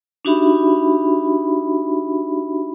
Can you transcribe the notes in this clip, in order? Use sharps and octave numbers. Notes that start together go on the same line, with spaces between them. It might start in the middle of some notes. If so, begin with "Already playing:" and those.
D4 D#4 F#4 G4 E5 B5